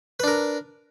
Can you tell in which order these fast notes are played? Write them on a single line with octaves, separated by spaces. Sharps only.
B4 D4 A#4